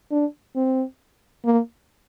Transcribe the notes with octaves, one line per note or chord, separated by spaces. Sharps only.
D4
C4
A#3